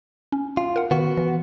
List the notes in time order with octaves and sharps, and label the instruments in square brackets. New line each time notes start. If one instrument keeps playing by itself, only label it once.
[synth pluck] C#4
[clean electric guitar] F4
[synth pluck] A#4 F#5
[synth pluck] D#3 [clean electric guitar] B3 F#4
[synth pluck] E3